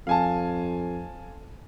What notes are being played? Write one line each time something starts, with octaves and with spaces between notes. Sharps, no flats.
F2 F5 G#5 A5